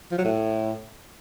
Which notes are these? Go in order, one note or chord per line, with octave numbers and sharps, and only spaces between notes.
F3
F#3
A2